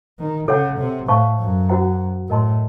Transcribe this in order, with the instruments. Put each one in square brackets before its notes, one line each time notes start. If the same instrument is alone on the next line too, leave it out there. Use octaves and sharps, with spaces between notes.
[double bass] D#3
[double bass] C#3 [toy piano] A4 C#5 F#5
[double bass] C3
[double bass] A2 [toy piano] C5 F5 A5 C#6
[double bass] F#2
[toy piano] C#4 F#4 C5 F#5 A#5
[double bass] A2 [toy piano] A#4 D#5 A5 C6